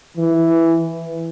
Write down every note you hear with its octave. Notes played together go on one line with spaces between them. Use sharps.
E3